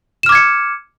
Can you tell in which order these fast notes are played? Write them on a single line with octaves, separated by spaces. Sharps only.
E7 F6 D6 G#6 C#7